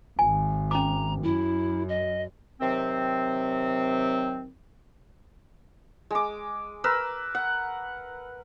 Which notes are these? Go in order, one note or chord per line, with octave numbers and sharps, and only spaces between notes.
G#1 G#5
C#4 A#5 D6
F#2 E4
D#5
C3 D#3 F#3 C4
G#3 D6
A#4 B4 E6
F#5